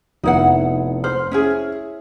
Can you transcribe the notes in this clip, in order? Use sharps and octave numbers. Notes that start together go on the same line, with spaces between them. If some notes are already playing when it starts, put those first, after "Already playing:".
F1 B3 D#4 E4 F#5
C5 F6
C#4 E4 G#4